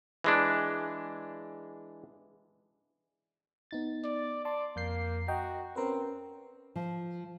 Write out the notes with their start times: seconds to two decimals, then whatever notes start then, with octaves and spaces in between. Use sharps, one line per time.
0.24 E3 G#3 D4
3.71 B3 D#4 A6
4.04 D5
4.45 D5 A5 C6 D6
4.76 F2 A#3 G6 C7
5.28 F#4 D#5 G5 A#5
5.76 C4 C#4 A#4 B4
6.76 F3